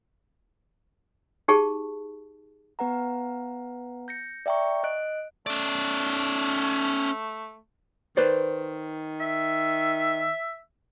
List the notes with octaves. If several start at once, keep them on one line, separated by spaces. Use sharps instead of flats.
D#4 G4 G#4 A5 C#6
B3 B4 F#5 A#5
G6 A#6 C#7
D5 E5 G5 A#5 C#6
D#5 F#6 D7
A3 C#4 D5
D#3 B4 C5 D5
E5